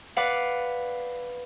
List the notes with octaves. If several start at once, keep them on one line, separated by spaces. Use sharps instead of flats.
B4 D5 F5 F#5